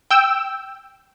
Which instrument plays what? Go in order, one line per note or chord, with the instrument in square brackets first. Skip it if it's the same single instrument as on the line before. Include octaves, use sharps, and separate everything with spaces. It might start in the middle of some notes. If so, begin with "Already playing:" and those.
[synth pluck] G5 E6